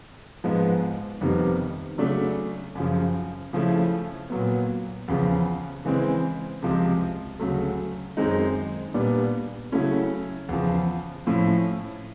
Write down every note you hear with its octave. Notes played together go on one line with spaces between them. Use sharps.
G#2 F3 G#3 B3
F2 C3 D#3 G3 B3
C#3 F#3 A3 D4
F#2 C#3 F3
C#3 F3 A3 C#4 E4
A#2 F#3 B3
E2 C#3 F3
C#3 E3 G#3 C4
C#2 C3 F3 G#3 C4
D2 C#3 F#3 A3
F#2 D#3 G#3 C4 D#4
A#2 G3 B3 D4
C#3 F#3 A3 C#4 E4
E2 C#3 F3
A2 F3 A3 C#4 E4